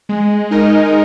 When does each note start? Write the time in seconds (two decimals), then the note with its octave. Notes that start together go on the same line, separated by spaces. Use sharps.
0.09 G#3
0.51 D#4 A#4 D#5